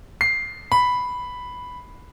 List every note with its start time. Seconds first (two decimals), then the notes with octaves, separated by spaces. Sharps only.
0.21 C7
0.72 B5